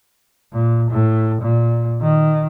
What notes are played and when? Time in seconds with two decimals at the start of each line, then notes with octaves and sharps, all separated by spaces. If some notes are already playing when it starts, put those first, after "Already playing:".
0.53 A#2
0.91 A2
1.42 A#2
2.02 D#3